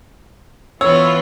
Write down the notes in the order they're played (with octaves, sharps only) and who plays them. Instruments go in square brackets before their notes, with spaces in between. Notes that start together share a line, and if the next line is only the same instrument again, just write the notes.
[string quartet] E3 B3 F4 [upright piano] C#5 [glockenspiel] E6